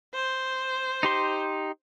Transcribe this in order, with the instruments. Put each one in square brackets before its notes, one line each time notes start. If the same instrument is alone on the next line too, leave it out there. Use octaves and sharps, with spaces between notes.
[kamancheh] C5
[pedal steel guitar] D#4 G4 C6